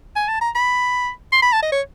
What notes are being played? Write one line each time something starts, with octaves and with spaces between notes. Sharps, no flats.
G#5
A5
A#5
B5
C6
B5
A5
D#5
C#5